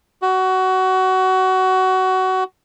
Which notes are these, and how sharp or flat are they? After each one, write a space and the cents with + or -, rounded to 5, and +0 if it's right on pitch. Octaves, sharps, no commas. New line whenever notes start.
F#4 +20